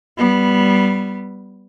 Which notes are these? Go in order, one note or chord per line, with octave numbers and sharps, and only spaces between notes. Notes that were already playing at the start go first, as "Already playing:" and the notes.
G3 B3